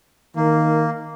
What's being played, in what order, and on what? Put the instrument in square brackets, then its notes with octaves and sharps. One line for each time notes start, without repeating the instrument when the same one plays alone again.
[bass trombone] D#3 [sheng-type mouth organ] A#3